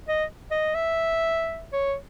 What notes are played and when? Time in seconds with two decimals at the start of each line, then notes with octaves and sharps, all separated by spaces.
0.08 D#5
0.51 D#5
0.75 E5
1.73 C#5